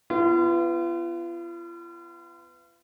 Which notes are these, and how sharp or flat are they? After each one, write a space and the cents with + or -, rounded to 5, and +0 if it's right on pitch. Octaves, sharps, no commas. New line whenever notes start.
B3 +20 F4 -40